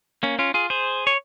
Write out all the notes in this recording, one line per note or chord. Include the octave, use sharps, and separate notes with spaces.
A#3 C#4
C#4 F4
F4 G#4
G#4 C5
C#5